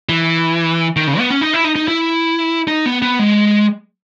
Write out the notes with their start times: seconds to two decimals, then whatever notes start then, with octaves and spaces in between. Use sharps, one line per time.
0.09 E3
0.96 D#3
1.07 C#3
1.19 B3
1.30 C#4
1.41 D#4
1.53 E4
1.64 D#4
1.76 D#4
1.88 E4
2.68 D#4
2.86 B3
3.02 B3
3.19 G#3